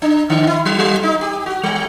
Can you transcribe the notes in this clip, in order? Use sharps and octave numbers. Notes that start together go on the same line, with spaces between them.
D4
D3
E4
F#3
F#3
D#4
G4
F#4
G3